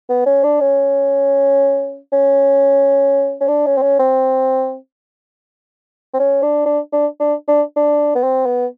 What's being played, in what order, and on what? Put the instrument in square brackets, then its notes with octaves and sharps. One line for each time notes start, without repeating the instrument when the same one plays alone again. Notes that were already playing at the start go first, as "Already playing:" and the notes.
[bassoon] B3
C#4
D4
C#4
C#4
C#4
D4
C#4
C4
C#4
C4
C4
C#4
D4
D4
D4
D4
D4
D4
B3
C4
B3